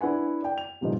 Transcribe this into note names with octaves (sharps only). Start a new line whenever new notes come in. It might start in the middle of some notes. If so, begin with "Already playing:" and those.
D4 E4 B4 F#5 G#5
D5 G5
F7
F#1 C2 G2 A#2 F3 D#4